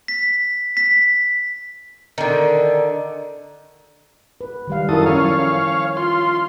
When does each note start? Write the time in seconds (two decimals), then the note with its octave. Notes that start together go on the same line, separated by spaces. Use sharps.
0.08 B6
0.77 B6
2.18 D3 D#3
4.41 B4
4.67 D#3 G3 F5
4.89 F#2 E4 A4 A#4 D#6
5.06 F3 C#4 C#5 F5
5.97 F4 C6